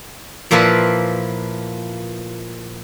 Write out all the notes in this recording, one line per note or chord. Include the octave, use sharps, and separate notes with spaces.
A#2 F3 A#3 E4 B4